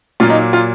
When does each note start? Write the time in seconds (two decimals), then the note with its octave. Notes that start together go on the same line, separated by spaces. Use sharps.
0.20 A#2 F#3 A#3 F4
0.30 D#4
0.53 F4